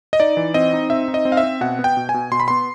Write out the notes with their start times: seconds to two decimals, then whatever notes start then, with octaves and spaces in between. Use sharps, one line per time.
0.13 D#5
0.20 D#4 D5
0.37 E3
0.54 C4 D#5
0.73 D#4
0.90 C4 E5
1.08 D#4
1.14 D#5
1.25 C4
1.32 F5
1.37 E5
1.43 C4
1.61 B2 F#5
1.79 B3
1.84 G5
1.97 B2
2.09 G#5
2.14 B2
2.31 B2 C6
2.40 B5
2.48 B3 C6